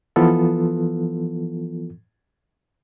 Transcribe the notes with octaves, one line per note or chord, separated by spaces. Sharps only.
E3 F3 B3 F4 A4